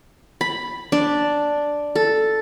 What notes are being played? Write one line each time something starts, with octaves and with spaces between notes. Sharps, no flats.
B5
D4
A4